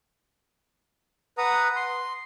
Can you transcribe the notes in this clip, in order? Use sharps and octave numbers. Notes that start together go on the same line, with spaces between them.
B4 F#5 A#5 D#6
C6